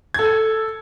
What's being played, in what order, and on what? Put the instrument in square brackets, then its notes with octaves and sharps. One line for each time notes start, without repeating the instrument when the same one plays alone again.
[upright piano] A4 G#6